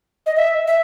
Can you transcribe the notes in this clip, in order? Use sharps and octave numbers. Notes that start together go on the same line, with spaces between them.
D#5
E5
E5